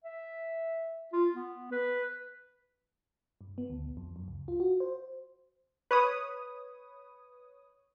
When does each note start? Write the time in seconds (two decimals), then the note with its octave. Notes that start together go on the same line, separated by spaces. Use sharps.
0.05 E5
1.13 F4
1.34 B3
1.72 B4
3.41 G2
3.58 B3
3.70 D2
3.85 A#1
3.97 F2
4.16 F#2
4.28 C#2
4.48 F4
4.60 F#4
4.80 C5
5.91 B4 C#5 D#6